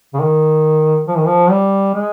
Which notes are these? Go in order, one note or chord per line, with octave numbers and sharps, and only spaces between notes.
C#3
D#3
F3
D#3
F3
G3
G#3